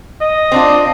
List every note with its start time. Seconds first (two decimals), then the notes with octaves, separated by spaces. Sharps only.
0.21 D#5
0.52 C4 D4 F4